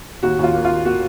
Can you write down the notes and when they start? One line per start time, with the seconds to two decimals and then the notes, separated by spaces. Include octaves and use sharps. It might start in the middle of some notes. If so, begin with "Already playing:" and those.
0.23 D#2 F#4
0.39 D#2 F4
0.54 A#3
0.65 D#2 F4
0.85 A#3 F#4